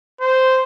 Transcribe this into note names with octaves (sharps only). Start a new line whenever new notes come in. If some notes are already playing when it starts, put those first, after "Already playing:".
C5